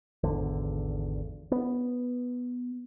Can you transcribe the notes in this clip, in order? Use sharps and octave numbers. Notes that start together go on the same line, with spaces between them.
G#1 E2 D3
B3